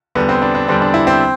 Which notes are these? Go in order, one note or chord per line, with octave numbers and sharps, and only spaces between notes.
E2 D3 G3 B3
C4
D4
D4
E2 D3 G3 C4
D4
E4
C4